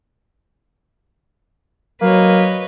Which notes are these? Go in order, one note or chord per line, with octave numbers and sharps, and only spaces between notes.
F#3 A#3 B4 C#5 D#5